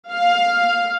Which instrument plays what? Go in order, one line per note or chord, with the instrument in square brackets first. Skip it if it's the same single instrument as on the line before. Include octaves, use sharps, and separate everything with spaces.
[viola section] F5